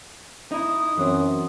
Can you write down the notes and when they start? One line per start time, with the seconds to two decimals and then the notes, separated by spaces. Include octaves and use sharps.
0.52 D#4 E4 D#6
0.97 F#2 E3 F#3 C4